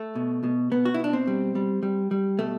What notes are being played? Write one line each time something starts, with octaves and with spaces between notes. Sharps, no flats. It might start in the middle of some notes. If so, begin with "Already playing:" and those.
Already playing: A3
B2
B2
B2 B3
F#4
E4
B2 D4
C4
G3
G3
G3
G3
B2 A3